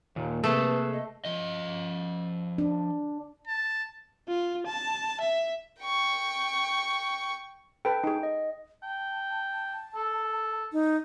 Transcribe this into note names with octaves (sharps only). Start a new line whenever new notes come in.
D#2 A#2
C3 A3 A#3 G#4 A4 B4 E5
D#5
F3 D#5
D4
A5
F4
A5
E5
G5 C#6
A4 B4 G5
D#4 G#4
D#5
G5 A5
A4
D#4